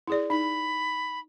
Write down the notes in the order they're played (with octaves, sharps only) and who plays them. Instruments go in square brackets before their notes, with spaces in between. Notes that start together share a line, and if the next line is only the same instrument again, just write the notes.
[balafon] E4 G#4 D5
[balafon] D#4 [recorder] B5